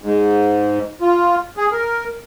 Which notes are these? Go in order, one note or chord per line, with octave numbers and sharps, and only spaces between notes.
G#2
F4
G#4
A#4